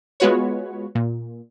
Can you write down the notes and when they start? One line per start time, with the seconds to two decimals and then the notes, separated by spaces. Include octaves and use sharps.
0.20 G#3 B3 F4 F#4 B4 C#5
0.95 A#2